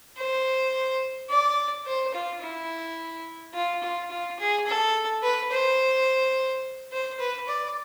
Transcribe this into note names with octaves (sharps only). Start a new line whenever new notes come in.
C5
D5
C5
F4
E4
F4
F4
F4
G#4
A4
B4
C5
C5
B4
D5